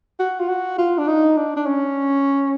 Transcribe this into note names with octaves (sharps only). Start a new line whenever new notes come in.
F#4
F4
F#4
F4
D4
D#4
D4
D4
C#4